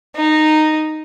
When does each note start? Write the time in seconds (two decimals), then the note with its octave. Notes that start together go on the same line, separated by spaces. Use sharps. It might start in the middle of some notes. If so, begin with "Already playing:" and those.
0.16 D#4